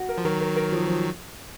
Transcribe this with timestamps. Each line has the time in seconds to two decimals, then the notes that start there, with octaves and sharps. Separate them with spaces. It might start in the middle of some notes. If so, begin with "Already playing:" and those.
Already playing: F#4
0.09 A#4
0.18 F3
0.24 D#3 F#3 A#4
0.41 A#4
0.56 A#4
0.72 F3
0.88 F3